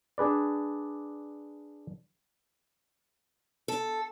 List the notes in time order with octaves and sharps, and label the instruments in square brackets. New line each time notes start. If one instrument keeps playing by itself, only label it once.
[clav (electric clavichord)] D4 G#4 B4 D5
[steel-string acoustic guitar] A4